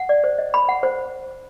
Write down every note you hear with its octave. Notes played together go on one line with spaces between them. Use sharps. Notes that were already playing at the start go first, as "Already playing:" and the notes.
Already playing: F#5
D5
C5
D#5
B5
F#5
C5